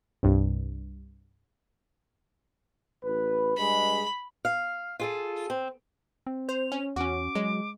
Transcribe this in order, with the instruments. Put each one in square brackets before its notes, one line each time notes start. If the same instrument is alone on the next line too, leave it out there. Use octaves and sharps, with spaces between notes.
[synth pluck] C2 G2
[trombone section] A1 B4
[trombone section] G2 G#3 [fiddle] B5
[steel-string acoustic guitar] F5
F4 G#4 A4
C4
[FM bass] C4
[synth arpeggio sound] C5 [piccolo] F7
[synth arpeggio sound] C#4
[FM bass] E2 [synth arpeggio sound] C#4 F#4 [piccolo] D6
[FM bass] F#3 [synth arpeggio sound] G#3